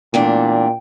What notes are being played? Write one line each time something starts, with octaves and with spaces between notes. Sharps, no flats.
E2 A#2 A3 D4 G5